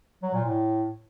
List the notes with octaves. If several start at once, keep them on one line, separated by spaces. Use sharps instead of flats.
F#3
A#2
A2